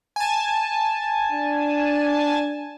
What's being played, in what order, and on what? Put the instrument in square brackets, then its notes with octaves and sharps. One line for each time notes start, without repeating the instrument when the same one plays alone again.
[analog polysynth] G#5 A5
[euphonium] D4